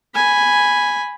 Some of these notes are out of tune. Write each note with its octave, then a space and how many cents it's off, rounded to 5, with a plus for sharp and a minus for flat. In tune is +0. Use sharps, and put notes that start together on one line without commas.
G#5 +0 B5 +0